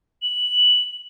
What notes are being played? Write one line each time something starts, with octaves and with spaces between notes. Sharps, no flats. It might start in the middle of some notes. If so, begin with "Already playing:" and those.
F#7